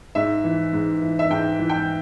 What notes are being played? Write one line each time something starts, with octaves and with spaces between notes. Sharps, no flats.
G#2 E5
E3
G#2
E3
E5
G#2 G5
E3
G5